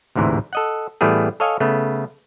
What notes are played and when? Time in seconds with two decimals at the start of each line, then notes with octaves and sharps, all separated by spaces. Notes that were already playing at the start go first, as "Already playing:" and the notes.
0.15 A1 D2 G#2 C3 E3
0.53 A4 D#5 F#5
1.01 A2 E3 G3 A3 B3 G#4
1.40 A4 C#5 D#5 F5 G#5
1.60 C#3 A3 B3